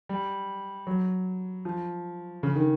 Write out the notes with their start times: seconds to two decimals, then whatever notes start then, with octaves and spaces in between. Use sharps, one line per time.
0.09 G3
0.87 F#3
1.65 F3
2.43 C#3
2.56 D#3